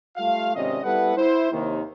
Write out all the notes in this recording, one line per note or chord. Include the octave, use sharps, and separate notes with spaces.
G3 A3 F4 F5
G#1 C3 C#4 D5 D#5
G3 B3 E4 A4 B4 F#5
E4 C5
D#2 C3 D#3